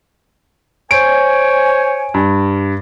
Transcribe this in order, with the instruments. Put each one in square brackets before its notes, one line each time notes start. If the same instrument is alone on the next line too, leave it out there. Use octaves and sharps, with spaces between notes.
[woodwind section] C5 C#5 G#5 [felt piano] D7
[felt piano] G2